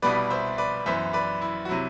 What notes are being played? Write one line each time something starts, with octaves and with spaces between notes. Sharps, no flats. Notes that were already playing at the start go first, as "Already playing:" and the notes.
C2 B2 G3 B3 B4 D5
C5 E5
B4 D5
F#2 E3 B3 C5 E5
B4 D5
E4
F#4
C3 F#3 E4